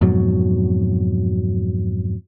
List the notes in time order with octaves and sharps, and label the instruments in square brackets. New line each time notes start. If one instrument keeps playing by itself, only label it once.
[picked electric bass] F2 G#2 B2 F#3